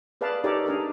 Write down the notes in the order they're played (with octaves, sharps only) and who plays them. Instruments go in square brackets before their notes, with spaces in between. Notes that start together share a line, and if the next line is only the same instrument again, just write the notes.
[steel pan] G#4 B4 D5 F5 A5
D#4 G4 A4 A#4 C#5 D5
D4 D#4 G#4 A#4